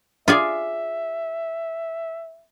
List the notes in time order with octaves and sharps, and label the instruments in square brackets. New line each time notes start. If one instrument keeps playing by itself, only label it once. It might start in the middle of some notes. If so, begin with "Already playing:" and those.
[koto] F4 G#4 D5 [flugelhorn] E5